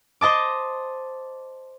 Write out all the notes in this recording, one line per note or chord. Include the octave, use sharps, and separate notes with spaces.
C5 D#5 A5 D6